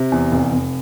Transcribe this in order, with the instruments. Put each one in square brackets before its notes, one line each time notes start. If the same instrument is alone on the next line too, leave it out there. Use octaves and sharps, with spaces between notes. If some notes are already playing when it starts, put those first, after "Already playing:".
Already playing: [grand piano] C3
E2
F1
F1